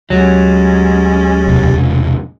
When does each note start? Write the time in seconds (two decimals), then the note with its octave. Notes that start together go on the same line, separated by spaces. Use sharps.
0.10 D2 F#3 G#3 C#4 G4 A6
1.47 E1 C2